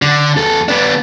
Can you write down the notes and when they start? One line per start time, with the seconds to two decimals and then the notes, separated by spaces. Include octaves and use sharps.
0.02 D3
0.37 E2 A4
0.68 B3 D4